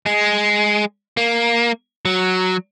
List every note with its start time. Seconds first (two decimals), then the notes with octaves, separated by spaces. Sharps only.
0.06 G#3
1.17 A#3
2.05 F#3